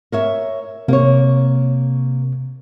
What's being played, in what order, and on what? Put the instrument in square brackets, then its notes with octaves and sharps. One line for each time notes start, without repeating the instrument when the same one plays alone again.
[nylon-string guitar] A#4 C#5 E5
[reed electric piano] C3 [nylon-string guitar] A#3 C#5